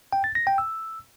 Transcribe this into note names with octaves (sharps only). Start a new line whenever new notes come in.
G5
A6
A#6
G5
E6